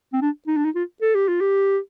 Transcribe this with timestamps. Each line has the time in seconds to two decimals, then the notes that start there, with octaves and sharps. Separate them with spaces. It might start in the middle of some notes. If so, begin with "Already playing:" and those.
0.13 C4
0.21 D4
0.47 D#4
0.57 D4
0.65 D#4
0.75 F4
1.02 A4
1.15 G4
1.28 F4
1.41 G4